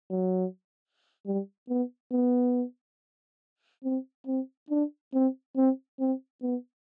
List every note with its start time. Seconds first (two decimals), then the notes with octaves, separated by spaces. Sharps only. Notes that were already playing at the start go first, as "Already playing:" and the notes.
0.11 F#3
1.26 G3
1.69 B3
2.12 B3
3.84 C4
4.27 C4
4.70 D4
5.14 C4
5.56 C4
6.00 C4
6.42 B3